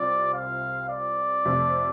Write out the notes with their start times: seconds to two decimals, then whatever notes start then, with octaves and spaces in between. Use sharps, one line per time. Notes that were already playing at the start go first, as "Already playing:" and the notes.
Already playing: C2 C3 C4 F4 D5
0.34 F5
0.89 D5
1.45 F2 C3 A3 C4